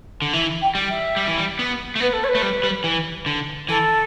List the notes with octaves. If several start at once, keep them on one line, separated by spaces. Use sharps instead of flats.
D3
E3 E5
G5
G3
E5
G3
E3
G3
B3
A3
B3 B4
A4
C#5
B4
A3
G3
G3
E3
D3
E3 A4